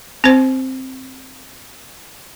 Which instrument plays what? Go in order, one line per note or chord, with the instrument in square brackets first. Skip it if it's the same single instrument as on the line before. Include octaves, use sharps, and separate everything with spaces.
[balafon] C4 C5